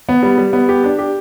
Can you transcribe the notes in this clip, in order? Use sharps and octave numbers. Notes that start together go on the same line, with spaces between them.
B3
G3
G3
B3
G4
D4
G4